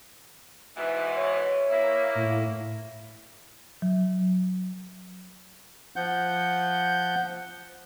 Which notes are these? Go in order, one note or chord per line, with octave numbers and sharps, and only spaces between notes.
G#2 B2 E3
C#5
A#3 E4
A2
F#3
F3 F#5 G6